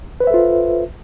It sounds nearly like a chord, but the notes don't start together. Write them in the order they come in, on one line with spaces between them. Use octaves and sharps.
B4 C5 E5 A4 F4